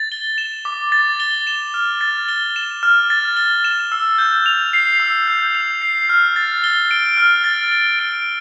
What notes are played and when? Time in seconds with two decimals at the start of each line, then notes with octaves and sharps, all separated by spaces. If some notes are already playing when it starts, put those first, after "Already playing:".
Already playing: A6
0.12 G7
0.38 E7
0.65 D6
0.92 A6
1.20 G7
1.47 E7
1.74 F6
2.01 A6
2.29 G7
2.56 E7
2.83 F6
3.10 A6
3.37 G7
3.64 E7
3.92 E6
4.18 G6
4.46 F7
4.73 C7
5.00 E6
5.28 G6
5.55 F7
5.82 C7
6.09 F6
6.36 A6
6.64 G7
6.91 D7
7.17 F6
7.44 A6
7.72 G7
7.99 D7